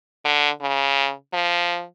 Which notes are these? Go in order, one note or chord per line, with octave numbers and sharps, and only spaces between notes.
D3
C#3
F3